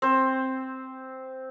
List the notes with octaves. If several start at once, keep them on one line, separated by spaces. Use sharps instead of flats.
C4 C5